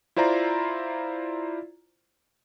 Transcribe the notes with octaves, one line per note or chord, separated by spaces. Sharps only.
E4 F4 C5 D5 A#5